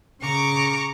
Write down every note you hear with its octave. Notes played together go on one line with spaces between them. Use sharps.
C#3 A#5 C#6 D6